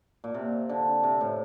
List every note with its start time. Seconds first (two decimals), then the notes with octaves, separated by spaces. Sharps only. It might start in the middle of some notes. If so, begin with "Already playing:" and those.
0.24 A#2
0.34 C3
0.69 D3
1.03 C3
1.21 A2